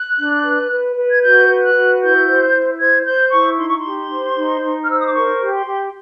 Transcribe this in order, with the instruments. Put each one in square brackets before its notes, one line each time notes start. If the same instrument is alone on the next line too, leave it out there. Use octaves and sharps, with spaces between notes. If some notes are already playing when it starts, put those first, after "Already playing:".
Already playing: [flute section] F#6
D4
B4
B4
B4
G#6
F#4 G6
B4
F#6
F#4
E4 G6
C5
E4
C5 G#6
C5 G6
E4 C#6
D#4 C6
C#6
C6
G4
C5
D#4
D#4
F6
C5 E6
D#6
D6
A#4 C#6
G4
C6
G4